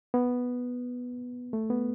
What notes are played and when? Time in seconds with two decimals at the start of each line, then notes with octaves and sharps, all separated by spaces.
0.14 B3
1.53 A3
1.70 B3